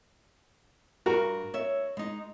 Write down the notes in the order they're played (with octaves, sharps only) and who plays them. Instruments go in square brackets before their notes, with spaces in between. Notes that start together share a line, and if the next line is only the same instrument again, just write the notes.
[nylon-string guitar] G2 [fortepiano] F#4 A#4
[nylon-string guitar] C#5 E5
G#3 D#4